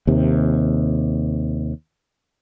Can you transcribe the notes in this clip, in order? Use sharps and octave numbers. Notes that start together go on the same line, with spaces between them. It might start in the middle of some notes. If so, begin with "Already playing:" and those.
D#2 C3